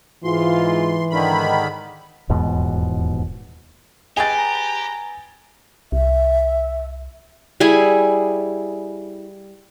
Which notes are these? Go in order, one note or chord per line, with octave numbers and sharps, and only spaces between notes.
G#2 E3 F4 C6
G#2 D3 D#3 B5
D#1 E2 G#2 B2
G4 G#4 B4 D#5 G5 G#5 A6
A#5
C2 E5
G3 E4 G#4 G#5